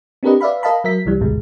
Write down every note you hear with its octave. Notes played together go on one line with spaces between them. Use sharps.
C4 D4 G4 A#4 B4 D#5
B4 D5 E5 F5 B5
A#4 D#5 F5 A5 B5
F#3 A#4 E5 B6
C2 E3 G3
A1 D2 G#2 B2 G#3